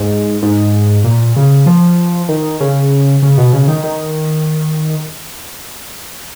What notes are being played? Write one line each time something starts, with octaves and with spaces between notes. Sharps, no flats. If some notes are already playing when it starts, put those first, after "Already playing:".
Already playing: G#2
G#2
A#2
C#3
F3
D#3
C#3
C#3
B2
C#3
D#3
D#3